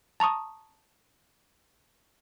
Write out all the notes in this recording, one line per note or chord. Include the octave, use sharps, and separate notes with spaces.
A5 A#5 C#6 D#6